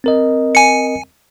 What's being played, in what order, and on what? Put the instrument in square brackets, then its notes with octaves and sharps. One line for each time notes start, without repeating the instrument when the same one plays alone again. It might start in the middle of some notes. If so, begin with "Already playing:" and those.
[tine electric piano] C4 A#4 D#5
[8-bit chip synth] G#5 C#7